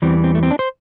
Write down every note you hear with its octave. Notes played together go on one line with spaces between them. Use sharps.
E2 E3 G3 C4
C4
A3
C4
D4
C5